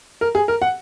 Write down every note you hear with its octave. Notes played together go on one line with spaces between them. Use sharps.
A#4
G#4
A#4
F#5